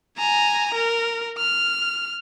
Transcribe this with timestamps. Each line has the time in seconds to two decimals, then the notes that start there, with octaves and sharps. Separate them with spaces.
0.18 G#5 A#5
0.74 A#4
1.38 F6